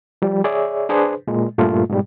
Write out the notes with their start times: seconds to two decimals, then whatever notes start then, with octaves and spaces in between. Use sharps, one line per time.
0.22 F3 G3
0.44 G#4 C#5 D5 E5
0.89 D4 G#4 B4 C5
1.27 A#2 G#3
1.58 G2 A#2 A3 F4
1.90 G#2 B2 G3